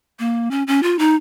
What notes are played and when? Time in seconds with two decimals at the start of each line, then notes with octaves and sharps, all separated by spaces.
0.19 A#3
0.51 C#4
0.67 C#4
0.83 F4
0.99 D#4